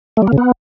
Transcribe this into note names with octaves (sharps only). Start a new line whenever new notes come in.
A3
G3
A#3
C#3
B3